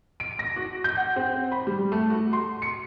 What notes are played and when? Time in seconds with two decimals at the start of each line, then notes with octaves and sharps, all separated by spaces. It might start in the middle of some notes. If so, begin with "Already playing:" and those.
0.20 D7
0.39 A#6
0.56 F#4
0.84 G6
0.97 F#5
1.16 C4
1.52 B5
1.67 G3
1.92 A3
2.10 F#4
2.33 C6
2.62 C#7